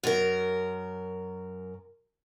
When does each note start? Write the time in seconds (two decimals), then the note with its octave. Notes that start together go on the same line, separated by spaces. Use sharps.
0.03 F#2 A#4